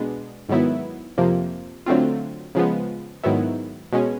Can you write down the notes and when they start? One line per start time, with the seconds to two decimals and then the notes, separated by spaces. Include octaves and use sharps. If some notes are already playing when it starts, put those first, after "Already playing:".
Already playing: B2 G#3 B3 D4
0.49 G#2 D#3 F#3 B3 E4
1.18 F2 C3 F3 A#3
1.86 D3 F#3 A3 C4 F4
2.55 C#3 F3 G#3 B3
3.23 G#2 D#3 F#3 B3 E4
3.92 B2 G#3 C#4